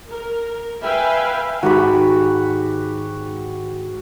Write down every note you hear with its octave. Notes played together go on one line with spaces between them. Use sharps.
A#4
B4 E5 F5 G5 G#5 B5
G#2 D#3 F#4 G4 B5